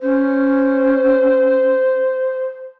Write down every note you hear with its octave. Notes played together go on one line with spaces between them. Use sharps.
C#4 C5